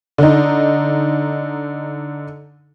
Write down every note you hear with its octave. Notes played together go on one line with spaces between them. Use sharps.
D3 D#4